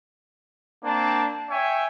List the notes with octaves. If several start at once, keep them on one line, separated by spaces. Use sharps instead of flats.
A#3 C4 D4 A5
C#5 E5 G5 G#5